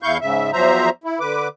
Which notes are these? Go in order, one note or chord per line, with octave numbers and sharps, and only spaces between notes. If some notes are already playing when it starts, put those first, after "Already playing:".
E2 E4 F5 C#6 G6
G#2 C#3 E5
E2 F3 F#3 C5 E5 A#5
E4
D3 B4 D6